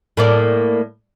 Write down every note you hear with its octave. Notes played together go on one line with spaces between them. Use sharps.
A2 A#3 D5